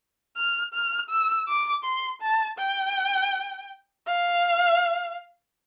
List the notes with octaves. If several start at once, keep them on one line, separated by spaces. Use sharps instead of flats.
F6
F6
E6
D6
C6
A5
G5
F5